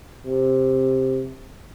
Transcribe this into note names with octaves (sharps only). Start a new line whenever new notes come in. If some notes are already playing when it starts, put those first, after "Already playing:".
C3